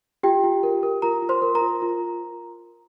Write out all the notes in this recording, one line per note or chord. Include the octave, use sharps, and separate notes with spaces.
F4 G4 G5
F4
A#4
A#4
F4 A#4 A#5
F4
C5 C6
A#4
A#4 A#5
F4
F4